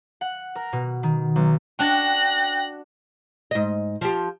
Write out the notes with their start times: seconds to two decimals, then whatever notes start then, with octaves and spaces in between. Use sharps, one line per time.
0.21 F#5
0.56 A#4
0.73 B2
1.03 D#3
1.36 B1
1.79 D4 F#4 G5 F#6 A#6
3.51 G#2 D#5
4.01 F3 G4